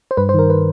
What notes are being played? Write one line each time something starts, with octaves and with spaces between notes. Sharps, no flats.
C5
G2 B4
C5
D#3 A#4
B4